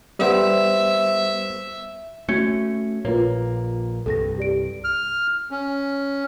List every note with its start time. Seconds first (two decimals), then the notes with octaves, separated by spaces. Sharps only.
0.19 G3 B3 C5 E5
2.29 A3 C#4 F#4 G#6 C#7
3.05 A#1 A#2 A#3 F4 B4 C#5
4.06 C2 G2 A4 A#6
4.38 G4 D5 D7
4.84 F6
5.51 C#4